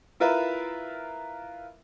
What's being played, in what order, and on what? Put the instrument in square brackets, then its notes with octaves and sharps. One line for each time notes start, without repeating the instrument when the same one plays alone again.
[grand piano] E4 F4 A#4 B4 E5